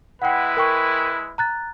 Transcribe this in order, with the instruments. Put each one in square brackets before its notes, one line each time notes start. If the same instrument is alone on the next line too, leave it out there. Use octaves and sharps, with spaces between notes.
[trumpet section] G#3 E4 B4 [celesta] F#5 G5
[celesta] A#4 G5 C#6
A#5 F#6 A6